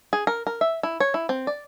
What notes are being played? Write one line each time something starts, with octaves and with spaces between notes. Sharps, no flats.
G#4
A#4
A#4
E5
E4
C#5
E4
C4
D5